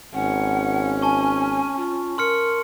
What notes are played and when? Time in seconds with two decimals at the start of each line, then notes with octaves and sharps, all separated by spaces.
0.14 G#1 C#4 F#5
1.02 G#5 A5 C#6
1.77 F4
2.18 A#4 C6 F6 C#7